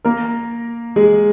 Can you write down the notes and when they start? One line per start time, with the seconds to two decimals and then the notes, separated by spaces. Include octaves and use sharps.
0.05 A#3 A#4
0.96 G#3 G#4